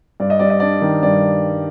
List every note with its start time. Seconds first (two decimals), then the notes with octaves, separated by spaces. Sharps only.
0.20 G2 D5
0.30 D#5
0.39 G3 D5
0.50 D#5
0.60 D4 D5
0.82 D#3
1.03 G2 D5